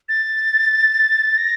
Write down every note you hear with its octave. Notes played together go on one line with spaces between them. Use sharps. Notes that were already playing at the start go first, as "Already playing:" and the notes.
A6
A#6